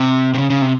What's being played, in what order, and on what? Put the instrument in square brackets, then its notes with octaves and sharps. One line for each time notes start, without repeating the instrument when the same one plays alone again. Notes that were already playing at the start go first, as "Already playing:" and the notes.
Already playing: [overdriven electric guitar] C3
C3
C#3
C#3
C3